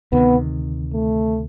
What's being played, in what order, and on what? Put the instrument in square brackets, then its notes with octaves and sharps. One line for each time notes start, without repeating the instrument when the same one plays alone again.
[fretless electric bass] D2 C3 D#3 [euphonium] B3
[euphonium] A3